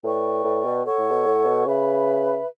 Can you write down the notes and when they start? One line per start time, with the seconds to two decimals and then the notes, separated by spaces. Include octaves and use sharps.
0.04 A2 B4 D5 G5 C#6
0.44 A2
0.65 B2
0.86 A4 C#5 F#5 C#6
0.98 A2
1.12 B2
1.26 A2
1.46 B2
1.66 C#3 B4 E5 B5